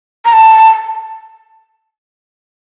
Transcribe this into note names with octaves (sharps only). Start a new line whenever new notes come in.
A#5
A5